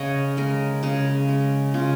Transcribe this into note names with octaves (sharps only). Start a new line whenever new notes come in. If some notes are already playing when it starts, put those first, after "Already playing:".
Already playing: C#3 C#5 D#5
G#3 A#4
C#3 G#4
G#3
C#3 F4